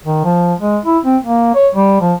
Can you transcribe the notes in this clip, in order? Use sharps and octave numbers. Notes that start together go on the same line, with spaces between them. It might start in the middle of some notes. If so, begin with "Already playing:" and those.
D#3
F3
G#3
E4
C4
A#3
C#5
G3
F3